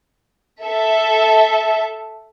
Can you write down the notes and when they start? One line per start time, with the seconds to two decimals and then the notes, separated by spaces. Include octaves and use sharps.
0.64 A4 E5